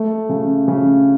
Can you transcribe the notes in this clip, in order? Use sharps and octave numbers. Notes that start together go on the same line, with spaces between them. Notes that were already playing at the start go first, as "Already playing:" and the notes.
Already playing: A3
C#3
C#3